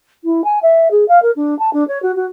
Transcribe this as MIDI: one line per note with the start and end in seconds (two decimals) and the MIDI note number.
0.24 0.44 64
0.44 0.59 80
0.62 0.88 76
0.91 1.07 68
1.08 1.21 77
1.22 1.31 70
1.36 1.57 62
1.59 1.73 81
1.73 1.86 62
1.88 2.01 73
2.02 2.14 66
2.16 2.26 66